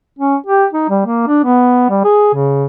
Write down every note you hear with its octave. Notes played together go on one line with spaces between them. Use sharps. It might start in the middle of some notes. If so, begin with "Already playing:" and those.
C#4
G4
D#4
G3
A#3
D4
B3
G3
G#4
C#3